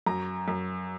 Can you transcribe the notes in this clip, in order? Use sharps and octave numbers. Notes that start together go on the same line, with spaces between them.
F#2 A#5
F#2